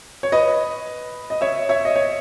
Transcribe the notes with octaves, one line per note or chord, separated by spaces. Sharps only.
C#5
B4 D#5
D#5
C#5 E5
C#5 E5
D#5
C#5